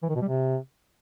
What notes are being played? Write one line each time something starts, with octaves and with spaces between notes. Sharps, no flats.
E3
D#3
B2
G3
C3